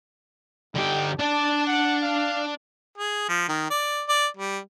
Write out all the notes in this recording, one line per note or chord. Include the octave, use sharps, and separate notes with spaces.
D3 D#4 G4
D4 D5 A5
F#5
F5
G#4
F3
D#3
D5
D5
G3